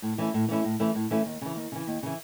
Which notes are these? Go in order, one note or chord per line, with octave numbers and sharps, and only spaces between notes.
A2
E3 A3 C#4 E4
A2
E3 A3 C#4 E4
A2
E3 A3 C#4 E4
A2
E3 A3 C#4 E4
D#2
C#3 E3
D#2
C#3 E3
D#2
C#3 E3